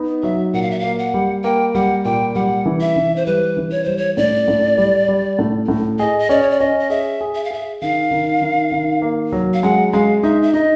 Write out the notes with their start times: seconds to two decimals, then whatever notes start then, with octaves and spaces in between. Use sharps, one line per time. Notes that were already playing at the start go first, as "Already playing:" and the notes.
Already playing: B3 D#4
0.23 F#3 E5
0.53 A#2 F#5
0.62 F5
0.71 E5
0.80 A#3 F5
0.99 F#5
1.14 G3
1.44 A#3 G5
1.74 G3 F#5
2.04 A#2 G5
2.35 G3 F#5
2.66 E3
2.81 E5
2.96 E3
3.16 C5
3.26 G3 B4
3.57 E3
3.71 C#5
3.84 G3 C5
3.97 C#5
4.17 A2 D5
4.48 A2
4.78 G3
5.08 G3
5.39 A2
5.68 A2
5.99 G#4 D#5
6.19 D#5
6.29 C#4 D5
6.42 C#5
6.50 D5
6.60 C#4 D#5
6.79 D#5
6.90 G#4 E5
7.21 G#4
7.35 E5
7.44 F5
7.51 G#4 E5
7.81 D#3 F5
8.11 D#3
8.41 D#3
8.72 D#3
9.02 A#3
9.32 F#3
9.54 F5
9.63 G#3 F#5
9.93 G#3 F5
10.23 D#4 E5
10.42 E5
10.53 D#4 D#5